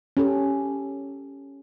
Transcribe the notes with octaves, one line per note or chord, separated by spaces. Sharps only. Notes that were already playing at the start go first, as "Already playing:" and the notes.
C#4 G4 A4